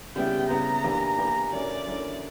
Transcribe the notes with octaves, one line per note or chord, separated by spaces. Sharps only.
C#3 G3 B3 E4 G5
C#3 G3 B3 E4 A#5
E3 A#3 D4 G4 B4
E3 A#3 D4 G4 B4
D3 F#3 C#4 E4 A#4 D5
D3 F#3 C#4 E4 A#4